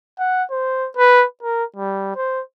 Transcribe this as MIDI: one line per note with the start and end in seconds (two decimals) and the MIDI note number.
0.19 0.44 78
0.51 0.89 72
0.97 1.25 71
1.43 1.64 70
1.76 2.13 55
2.16 2.41 72